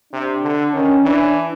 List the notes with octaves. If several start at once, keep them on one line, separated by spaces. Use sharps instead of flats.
C3 D4
D3
D#3 C#4
E3 D4